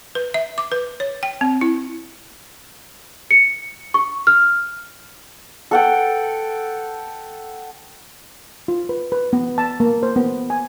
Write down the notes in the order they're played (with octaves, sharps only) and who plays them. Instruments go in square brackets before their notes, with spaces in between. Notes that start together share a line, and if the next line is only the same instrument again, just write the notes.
[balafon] B4
E5
D6
B4
C#5
G5
C4
E4
[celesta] C#7
C#6
F6
[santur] A4 F#5 G5
[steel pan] F4
B4
B4
B3
A5
A#3
C5
B3
G#5